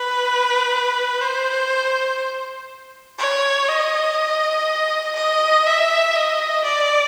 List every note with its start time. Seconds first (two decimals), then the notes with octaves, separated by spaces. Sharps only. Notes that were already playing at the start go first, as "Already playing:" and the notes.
Already playing: B4
1.21 C5
3.19 C#5
3.68 D#5
5.16 D#5
5.66 E5
6.16 D#5
6.64 D5